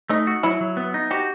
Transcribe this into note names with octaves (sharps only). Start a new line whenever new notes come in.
A3 D#4
F#4
F#3 E4
F#3
B3
D#4
F#4 G4